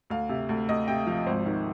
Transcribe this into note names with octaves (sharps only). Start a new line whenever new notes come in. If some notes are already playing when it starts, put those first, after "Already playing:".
D2 F5
C3
D2
D2 D#5
C3 G5
F3 F5
G#1 C5
D#3